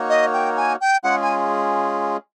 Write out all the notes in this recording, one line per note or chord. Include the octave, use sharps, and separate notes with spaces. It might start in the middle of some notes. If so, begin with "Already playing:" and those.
Already playing: A#3 D#4 F#4 A#4 C#5
D#5
G5
G#5
G5
G#3 C#4 F4 G#4 F#5
G#5